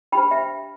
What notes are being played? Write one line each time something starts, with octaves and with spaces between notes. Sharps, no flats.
D4 G4 C5 G5 B5
E5 G5